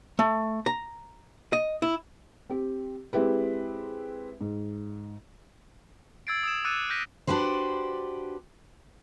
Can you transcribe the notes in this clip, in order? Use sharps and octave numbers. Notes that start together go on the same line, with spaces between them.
A3
A#5
D#5
E4
C4 G4
G#3 C4 E4 G4 B4
G#2
E6 G#6 A6 C7 D7
D#6 E6 G#6 E7
D6 E6 F#6 A6 C#7 D#7
F6 G6 A#6 B6 D#7
D4 F#4 G4 B4 C5